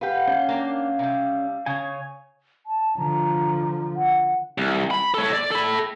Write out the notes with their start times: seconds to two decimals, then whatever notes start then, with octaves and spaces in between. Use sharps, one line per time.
0.01 G4 B4 F5 F#5
0.28 C#4 F5 G5
0.49 A#3 D4
0.99 C3 G3
1.66 C#3 C#5 G#5
2.66 A5
2.98 D3 F3 A#5
3.96 F#5
4.58 C2
4.91 B5
5.14 A4 C#5
5.33 D5
5.51 A4 B5